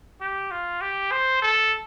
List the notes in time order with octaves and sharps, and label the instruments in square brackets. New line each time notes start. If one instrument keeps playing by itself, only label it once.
[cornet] G4
F4
G4
C5
A4